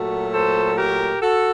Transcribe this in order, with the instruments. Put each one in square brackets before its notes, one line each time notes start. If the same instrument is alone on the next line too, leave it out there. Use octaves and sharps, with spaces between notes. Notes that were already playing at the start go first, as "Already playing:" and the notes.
Already playing: [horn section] A#2 F#3 A3 F#4 A4
A4 C5
G4 A#4
F#4 A4